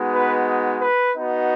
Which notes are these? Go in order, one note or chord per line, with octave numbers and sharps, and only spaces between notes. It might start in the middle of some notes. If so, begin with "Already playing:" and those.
Already playing: G#3 B3 D#4 F#4
B4
B4
B3 D#4 F#4